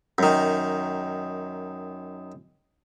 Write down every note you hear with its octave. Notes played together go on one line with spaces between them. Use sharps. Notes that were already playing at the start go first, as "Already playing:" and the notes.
F#2 D#3